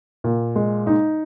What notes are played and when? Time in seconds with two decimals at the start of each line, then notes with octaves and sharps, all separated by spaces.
0.24 A#2
0.56 G#3
0.87 D#4